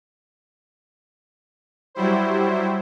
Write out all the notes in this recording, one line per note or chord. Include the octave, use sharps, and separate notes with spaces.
F#3 G3 E4 C5